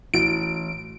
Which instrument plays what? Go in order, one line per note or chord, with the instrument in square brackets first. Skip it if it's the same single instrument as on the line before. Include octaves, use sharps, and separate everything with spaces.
[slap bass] A1 [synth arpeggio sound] E4 F#4 [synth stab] D7